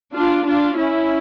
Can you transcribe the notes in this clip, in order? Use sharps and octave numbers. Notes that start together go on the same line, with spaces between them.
D4 F4
D4 F4
C#4 E4